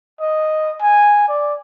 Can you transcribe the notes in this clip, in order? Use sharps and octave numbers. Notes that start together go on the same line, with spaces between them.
D#5
G#5
D5